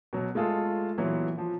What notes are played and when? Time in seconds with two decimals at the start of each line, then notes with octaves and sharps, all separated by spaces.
0.13 B2 F#3
0.35 G#3 A3 F4 G#4 A4
0.97 A#2 E3 F#3 B3
1.38 F3